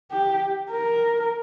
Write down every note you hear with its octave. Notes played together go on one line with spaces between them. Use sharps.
G4
A#4